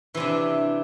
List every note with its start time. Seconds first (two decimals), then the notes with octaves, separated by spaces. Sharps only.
0.15 E3
0.17 C3
0.20 D4